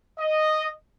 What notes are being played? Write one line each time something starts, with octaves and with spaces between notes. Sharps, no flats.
D#5